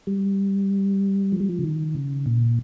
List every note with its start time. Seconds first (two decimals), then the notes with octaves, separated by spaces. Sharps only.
0.07 G3
1.32 F3
1.40 G3
1.49 F3
1.59 C#3
1.64 D#3
1.95 C#3
2.26 A#2